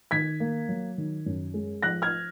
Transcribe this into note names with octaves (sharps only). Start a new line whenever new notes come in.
D#3 G#6 B6
A#3
F#3
D#3
F#2
G#3
F3 F#6 A#6
F6 G#6